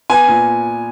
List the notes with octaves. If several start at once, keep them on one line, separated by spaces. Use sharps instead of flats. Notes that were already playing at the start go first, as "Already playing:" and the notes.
B3 G#5
A#2